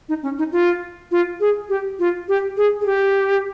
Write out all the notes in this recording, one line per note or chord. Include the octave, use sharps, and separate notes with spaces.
D#4
C#4
D#4
F4
F4
G#4
G4
F4
G4
G#4
G#4
G4